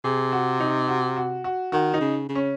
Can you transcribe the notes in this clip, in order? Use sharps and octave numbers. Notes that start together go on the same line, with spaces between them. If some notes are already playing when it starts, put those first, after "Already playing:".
C3 G#4
F#4
D#4
F#4
F#4
F#4
D#3 F#4
D#4
C#3
C#3
C#4